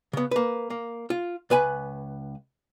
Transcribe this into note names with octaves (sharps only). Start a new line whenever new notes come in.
C#3 B3
A#3 B4
A#3
F4
C#2 B4 G#5 B5